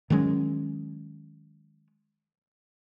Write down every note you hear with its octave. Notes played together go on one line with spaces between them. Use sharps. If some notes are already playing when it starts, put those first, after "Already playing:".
D#3 F#3 G#3 C#4